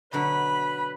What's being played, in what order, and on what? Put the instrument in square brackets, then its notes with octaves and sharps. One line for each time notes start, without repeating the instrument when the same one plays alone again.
[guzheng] B2 D3 F#3 [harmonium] B4 [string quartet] B5